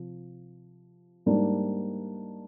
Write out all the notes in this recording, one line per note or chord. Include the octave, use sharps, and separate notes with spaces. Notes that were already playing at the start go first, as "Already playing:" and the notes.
Already playing: C3 F3
G#2 G3 A#3 D4